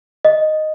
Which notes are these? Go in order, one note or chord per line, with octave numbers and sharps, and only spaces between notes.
D#5